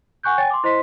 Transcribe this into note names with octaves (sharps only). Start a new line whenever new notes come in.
F#5 G#5 C#6 F#6 G6
C#5 G5 G#5 A6
C6 D6
E4 C5 D#5 C6 B6